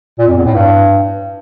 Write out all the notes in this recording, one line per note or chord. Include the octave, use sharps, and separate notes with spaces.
A#2
F2
E2
A2
G2